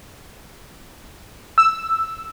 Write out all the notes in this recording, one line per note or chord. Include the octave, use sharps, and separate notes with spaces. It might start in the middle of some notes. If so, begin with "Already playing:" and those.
E6